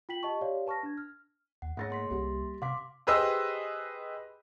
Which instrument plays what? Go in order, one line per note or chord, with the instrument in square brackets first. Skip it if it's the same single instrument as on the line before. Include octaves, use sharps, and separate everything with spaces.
[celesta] F4 G5 B6 F#7
G4 D#5 A5 C#6
G4 C#5 D5 F5
B4 A5 C#6 F6 A#6
D4 G#6
F6
[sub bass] D#2 [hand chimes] F#5
[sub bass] G#2 [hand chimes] A3 G#4 C#5 [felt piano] F#5 A6 A#6
[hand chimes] A#3 C6 B6
[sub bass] C2 [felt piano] G3 G4
[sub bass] C3 [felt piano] F5 B6 [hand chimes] C6 D6
[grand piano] G4 G#4 B4 C5 D#5 E6